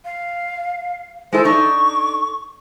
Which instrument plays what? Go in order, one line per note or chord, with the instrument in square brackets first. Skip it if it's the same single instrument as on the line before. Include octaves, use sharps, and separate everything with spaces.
[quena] F5
[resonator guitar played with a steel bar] G#3 E4 A4 [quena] C5
[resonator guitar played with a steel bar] D4 D#4 A4 [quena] C#6